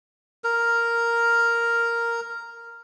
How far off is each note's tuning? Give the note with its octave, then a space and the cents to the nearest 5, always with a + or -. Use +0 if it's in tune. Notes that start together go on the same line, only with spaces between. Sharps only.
A#4 +0